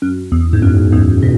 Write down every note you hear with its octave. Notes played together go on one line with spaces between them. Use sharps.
F#2
E2
G#2
F#2
E2 G#2
B2